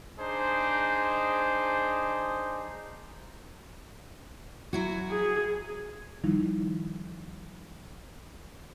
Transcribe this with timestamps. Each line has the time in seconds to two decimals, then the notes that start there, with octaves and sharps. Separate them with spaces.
0.19 D4 D#4 G#4 C5
4.73 F#3 E4 F#4
5.10 G#4
6.24 D#3 F3 G3 D#4 E4